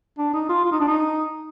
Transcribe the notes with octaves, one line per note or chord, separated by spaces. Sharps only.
D4
D#4
F4
F4
D#4
D4
D#4